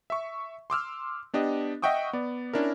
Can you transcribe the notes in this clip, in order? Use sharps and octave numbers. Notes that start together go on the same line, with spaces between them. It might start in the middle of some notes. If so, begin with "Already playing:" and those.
E5 C#6
C6 D6 E6 F6
B3 D4 G4 D#5
D#5 E5 F#5 G5 C#6 D#6
B3 D5
C#4 D4 E4 A#4